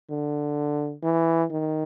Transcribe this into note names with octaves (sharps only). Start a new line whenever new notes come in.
D3
E3
D#3